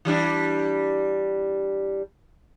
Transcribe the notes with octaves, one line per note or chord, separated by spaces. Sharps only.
E3 G3 D4